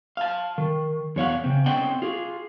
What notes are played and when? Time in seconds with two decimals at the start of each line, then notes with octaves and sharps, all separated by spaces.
0.17 F5 A5
0.58 D#3
1.16 E2 C#5 F5 F#5
1.44 C#3 C4
1.66 C4 C#4 D#5 F#5 G5
2.02 F4 G#4